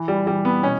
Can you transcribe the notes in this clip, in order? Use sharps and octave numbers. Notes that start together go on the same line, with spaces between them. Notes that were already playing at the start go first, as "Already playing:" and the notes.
Already playing: E3
G3
E3 G3
B3
B2 C#4